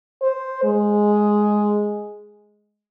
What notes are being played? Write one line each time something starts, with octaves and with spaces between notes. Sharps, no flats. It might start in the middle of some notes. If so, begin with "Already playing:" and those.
C5
G#3